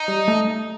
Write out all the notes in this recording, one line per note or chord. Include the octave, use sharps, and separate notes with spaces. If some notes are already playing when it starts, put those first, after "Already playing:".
Already playing: D#4
G3
A3